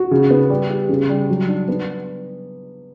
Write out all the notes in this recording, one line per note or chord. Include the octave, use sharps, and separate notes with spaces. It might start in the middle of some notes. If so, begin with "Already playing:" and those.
Already playing: F#4
C#3
B3
G3
G4
C#3
G3
F#3
D4
B3